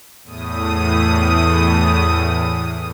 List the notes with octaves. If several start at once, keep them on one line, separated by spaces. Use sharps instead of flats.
E2 A2 D#6